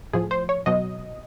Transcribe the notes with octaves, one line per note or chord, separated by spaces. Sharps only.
A2 F3 G#4
C5
C#5
B2 F#3 D#5